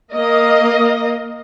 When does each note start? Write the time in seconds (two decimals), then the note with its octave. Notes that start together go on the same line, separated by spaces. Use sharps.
0.13 A#3 D#5